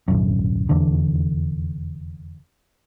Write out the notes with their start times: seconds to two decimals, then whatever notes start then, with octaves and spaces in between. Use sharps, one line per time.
0.08 D1 B1 F#2
0.69 F1 E2 D3